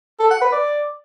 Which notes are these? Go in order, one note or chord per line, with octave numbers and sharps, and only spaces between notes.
A4
F#5
B4
D5